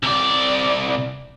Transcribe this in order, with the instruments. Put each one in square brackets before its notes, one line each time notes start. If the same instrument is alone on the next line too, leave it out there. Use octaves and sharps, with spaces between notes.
[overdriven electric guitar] C2 D5